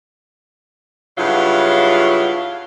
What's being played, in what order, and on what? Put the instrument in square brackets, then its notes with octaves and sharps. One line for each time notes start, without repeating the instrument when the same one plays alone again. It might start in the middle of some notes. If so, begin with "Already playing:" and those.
[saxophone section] G2 C#3 F#3 E4 F4